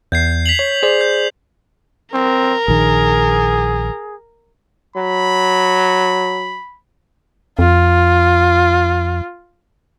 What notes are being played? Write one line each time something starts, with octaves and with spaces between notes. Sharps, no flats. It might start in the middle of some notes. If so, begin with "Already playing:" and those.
E2 G6 G#6 C7
B6 F7 F#7
C#5
G#4 C5 D5
G6 C7
C4 A#4
A#1 D#3 G#4
F#3 B5
F2 F4